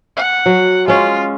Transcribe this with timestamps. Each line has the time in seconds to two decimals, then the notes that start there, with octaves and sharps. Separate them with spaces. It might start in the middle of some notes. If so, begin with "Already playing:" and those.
0.17 F#5
0.46 F#3
0.88 G#3 C#4 F4